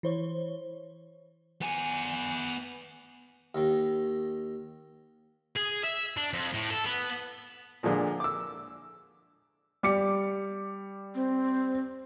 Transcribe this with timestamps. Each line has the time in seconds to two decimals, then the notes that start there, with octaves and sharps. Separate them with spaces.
0.03 E3 C5 C#5
1.62 B3 G#5
3.55 D#2 D#3
5.56 G#4
5.84 E5
6.17 D4
6.33 F2
6.53 A2
6.70 A4
6.85 B3
7.83 A#2 D3 F3 G#3
8.20 D6 E6
9.83 G3 D6 C#7
11.15 C4